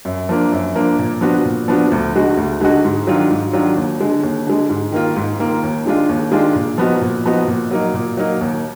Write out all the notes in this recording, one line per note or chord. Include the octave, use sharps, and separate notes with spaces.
F#2
F3 A#3 D4
F#2
F3 A#3 D4
A#2
F3 B3 D4 F#4
A#2
F3 B3 D4 F#4
D2
D3 G#3 D#4 F#4
D2
D3 G#3 D#4 F#4
G#2
D#3 F#3 D4 F4
G#2
D#3 F#3 D4 F4
D#2
D3 G#3
D#2
D3 G#3
G#2
D#3 A#3 F4
G#2
D#3 A#3 F4
D#2
D#3 G#3 D4 F4
D#2
D#3 G#3 D4 F4
A#2
F3 B3 D#4 F#4
A#2
F3 B3 D#4 F#4
A#2
F#3 A#3 D#4
A#2
F#3 A#3 D#4
D#2